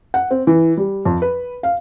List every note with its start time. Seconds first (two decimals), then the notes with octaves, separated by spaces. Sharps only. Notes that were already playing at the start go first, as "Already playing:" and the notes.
0.14 F#5
0.31 C4
0.47 E3
0.77 G3
1.05 F2
1.22 B4
1.63 F5